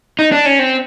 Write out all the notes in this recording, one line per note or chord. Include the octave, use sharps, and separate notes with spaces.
D#4
D4
C#4
C4